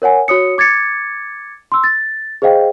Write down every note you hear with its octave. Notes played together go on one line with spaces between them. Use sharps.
A#4 C#5 F#5 G#5
F#4 C#5 D#6 C#7
D6 G#6 A6 C#7
C6 E6
A6
G#4 C5 D#5 F5 G5